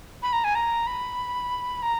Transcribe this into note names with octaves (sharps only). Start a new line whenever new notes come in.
B5
A#5
G#5
A#5
B5
A#5